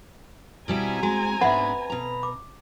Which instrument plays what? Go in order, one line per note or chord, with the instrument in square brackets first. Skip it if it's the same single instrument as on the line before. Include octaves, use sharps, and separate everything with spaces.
[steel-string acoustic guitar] B2 G3 E4 [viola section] C4 G#5 A#5
[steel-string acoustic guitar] G#3 [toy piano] F#4
[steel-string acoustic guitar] G#2 B3 D4 [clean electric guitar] B4 [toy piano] E5 F#5
[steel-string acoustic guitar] B2 A#5
[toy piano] D6